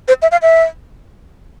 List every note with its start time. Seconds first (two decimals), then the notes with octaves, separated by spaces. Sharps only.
0.08 C5
0.22 E5
0.32 F5
0.42 E5